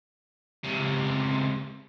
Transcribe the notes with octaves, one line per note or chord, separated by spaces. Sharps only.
C#2 C3